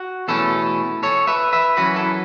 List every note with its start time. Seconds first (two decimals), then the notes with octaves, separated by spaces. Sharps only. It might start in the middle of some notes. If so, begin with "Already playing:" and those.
Already playing: F#4
0.28 E2 B2 A3 C#4 E4 A4
1.03 A4 C#5
1.27 B4 E5
1.53 B4 E5
1.77 F#2 E3 C#4 F#4 B4
1.96 E4 A4